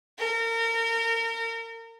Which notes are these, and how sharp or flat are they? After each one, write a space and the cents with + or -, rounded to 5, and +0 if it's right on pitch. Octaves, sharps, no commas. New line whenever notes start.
A#4 -30